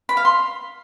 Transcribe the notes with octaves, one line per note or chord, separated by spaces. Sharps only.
B5
F5
C6